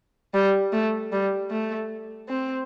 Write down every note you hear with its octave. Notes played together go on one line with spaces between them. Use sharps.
G3
A3
G3
A3
C4